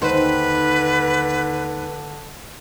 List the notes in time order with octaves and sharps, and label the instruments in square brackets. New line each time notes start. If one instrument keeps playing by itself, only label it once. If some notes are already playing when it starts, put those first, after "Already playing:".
[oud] D#2 D#4 C5 [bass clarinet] D3 [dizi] B4